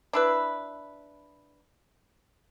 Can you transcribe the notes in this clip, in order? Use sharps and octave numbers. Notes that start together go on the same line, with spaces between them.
D4 E4 B4